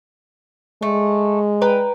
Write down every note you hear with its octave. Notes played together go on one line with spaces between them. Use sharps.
G#3 A3
B4 G5 A#5